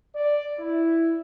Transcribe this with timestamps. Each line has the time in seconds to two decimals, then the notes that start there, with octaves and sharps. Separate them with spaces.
0.15 D5
0.59 E4